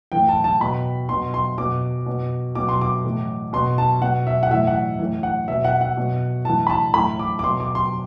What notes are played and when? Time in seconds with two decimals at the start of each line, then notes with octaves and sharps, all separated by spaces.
0.12 A2 E3 G5
0.29 A5
0.44 A5
0.61 B2 B5
1.09 B2 C6
1.34 C6
1.58 B2 D6
2.06 B2
2.55 B2 D6
2.69 C6
2.81 D6
3.04 A2 E3
3.53 B2 C6
3.78 A5
4.01 B2 F#5
4.27 E5
4.43 F#5
4.51 A2 E3 E5
4.67 F#5
4.99 A2 E3
5.23 F#5
5.48 B2 E5
5.65 F#5
5.81 F#5
5.97 B2
6.45 A2 E3 A5
6.67 B5
6.70 A5
6.94 A2 E3 B5
7.19 D6
7.39 D6
7.43 B2 C6
7.60 D6
7.75 C6